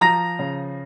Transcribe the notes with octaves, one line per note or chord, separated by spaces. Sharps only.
F3 A#5 A#6
C#3